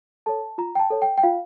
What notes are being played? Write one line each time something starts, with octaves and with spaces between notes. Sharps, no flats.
A4 C#5 A5
F4 A#5
G5
A5
A4 C#5
G5
G5
F4 F5